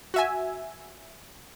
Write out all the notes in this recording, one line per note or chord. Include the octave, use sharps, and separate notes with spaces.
F#4 E5 G#5